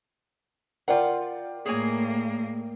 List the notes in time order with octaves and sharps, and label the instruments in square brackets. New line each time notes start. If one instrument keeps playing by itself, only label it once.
[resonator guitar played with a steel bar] F4 F#5 [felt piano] A#4 D5 G5
[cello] A2 A#3 [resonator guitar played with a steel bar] G#4 C#5 G#5